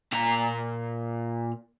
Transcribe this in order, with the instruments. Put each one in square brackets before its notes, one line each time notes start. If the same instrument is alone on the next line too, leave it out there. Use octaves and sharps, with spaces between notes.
[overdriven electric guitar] A#2 A#5